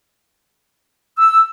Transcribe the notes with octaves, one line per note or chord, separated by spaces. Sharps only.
E6